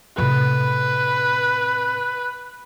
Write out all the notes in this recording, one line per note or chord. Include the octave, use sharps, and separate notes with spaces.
A2 C3 B4